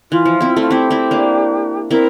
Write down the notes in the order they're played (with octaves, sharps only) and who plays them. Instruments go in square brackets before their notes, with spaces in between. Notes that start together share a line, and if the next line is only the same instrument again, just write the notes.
[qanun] E3 [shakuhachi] F4
[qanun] F3
C4 E4
[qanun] A3 C4 [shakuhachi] F4
[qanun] C4 E4 [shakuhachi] G4
[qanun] C4 E4
A#3 D4
[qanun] C4 E4 [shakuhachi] A#4